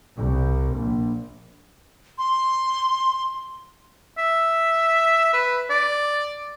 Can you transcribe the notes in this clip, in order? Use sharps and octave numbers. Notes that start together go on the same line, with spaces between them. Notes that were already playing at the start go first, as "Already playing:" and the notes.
C2
A#1
C6
E5
B4
D5